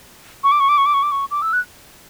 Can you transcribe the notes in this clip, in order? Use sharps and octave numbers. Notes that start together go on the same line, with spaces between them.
C#6
D6
C#6
D6
C#6
D6
C#6
D6
C#6
D6
E6
F#6